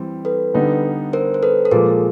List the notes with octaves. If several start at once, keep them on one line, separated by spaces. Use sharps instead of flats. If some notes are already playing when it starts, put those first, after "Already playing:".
Already playing: E3 G3 C4
A4 B4
D3 G3 B3 D#4
A#4 C5
C5
A4 B4
A4
A#2 F3 G#3 G#4 A#4